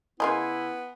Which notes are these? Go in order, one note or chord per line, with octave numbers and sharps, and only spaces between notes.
C#3 B3 E4 A#4 D#5 G#5 C6